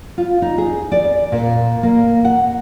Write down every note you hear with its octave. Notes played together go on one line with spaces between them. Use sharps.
F4
D#4
G#4
D5
A#2
A#3
F#5